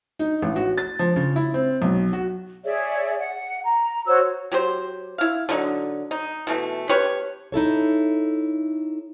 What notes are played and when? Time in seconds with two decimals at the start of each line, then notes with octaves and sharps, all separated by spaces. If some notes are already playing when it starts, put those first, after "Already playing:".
0.19 D#4
0.42 A1
0.56 F#4
0.78 A6
0.99 F3
1.16 C#3
1.36 E4
1.54 C4
1.82 B1
2.13 F#4
2.65 G#4 C#5 D5 E5
3.20 F#5
3.65 A#5
4.07 F#4 C5 C#5 E6
4.52 F#3 G4 C5
5.18 E4 F5
5.49 D3 F#3 D#4
6.11 D#4
6.47 B2 E3 A3
6.89 C#4 G4 B4 C#5
7.52 D#4 E4 A4 C#5